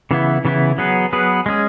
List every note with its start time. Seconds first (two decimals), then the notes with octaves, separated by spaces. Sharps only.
0.11 C#3 E3 B3 E4
0.45 C#3 E3 B3 E4
0.78 F#3 B3 G#4 B4
1.13 F#3 B3 G#4 B4
1.46 G#3 C#4 G#4